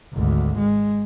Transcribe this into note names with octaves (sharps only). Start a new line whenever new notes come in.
G#1 D2
G#3